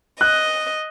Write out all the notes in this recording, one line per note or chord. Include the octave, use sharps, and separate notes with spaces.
D#5 F#6